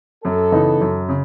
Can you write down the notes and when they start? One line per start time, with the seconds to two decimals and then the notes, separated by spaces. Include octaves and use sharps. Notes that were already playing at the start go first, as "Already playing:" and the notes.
0.24 F#2 A4
0.52 C#3 E3 B3 D#4
0.81 F#2
1.09 C#3